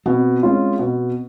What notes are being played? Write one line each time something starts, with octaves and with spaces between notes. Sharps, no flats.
B2 C4
G#3 C#4 F4
B2